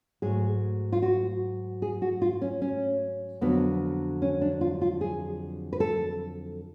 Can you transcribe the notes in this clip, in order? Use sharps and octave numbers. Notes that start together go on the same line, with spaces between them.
G#2 F#3 A3 G#4
F4
F#4
G#4
F#4
F4
C#4
C#4
F2 D3 F#3 B3
C#4
D4
F4
F4
G#4
B4
A4